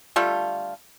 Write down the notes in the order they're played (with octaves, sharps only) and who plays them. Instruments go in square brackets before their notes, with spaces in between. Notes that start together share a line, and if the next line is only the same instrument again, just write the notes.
[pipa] D3 G3 A3 F4